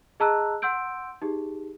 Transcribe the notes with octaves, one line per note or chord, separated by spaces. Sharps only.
G#4 D#5 A5 A#5 E6 F#6
F#5 C6 E6 G6 D7
D#4 G4 G#4